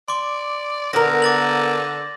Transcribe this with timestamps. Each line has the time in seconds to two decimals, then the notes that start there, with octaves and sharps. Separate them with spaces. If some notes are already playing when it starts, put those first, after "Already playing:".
0.08 D5 C6 D6
0.93 D3 B3 A#4 A#6
1.22 D6 A6 F#7